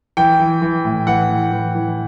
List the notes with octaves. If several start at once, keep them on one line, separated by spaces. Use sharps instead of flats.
E3 G5
E3
E3
A2
E3 F#5
A2
E3
E3